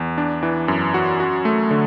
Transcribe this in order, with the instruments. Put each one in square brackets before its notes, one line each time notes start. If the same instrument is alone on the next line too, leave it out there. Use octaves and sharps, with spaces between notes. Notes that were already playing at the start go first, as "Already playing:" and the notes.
Already playing: [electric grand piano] E2
D4
E3
F#2
F#4
F#4
A3
D3